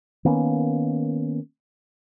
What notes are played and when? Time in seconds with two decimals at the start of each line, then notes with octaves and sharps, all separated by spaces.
0.25 D#3 A#3 B3 C#4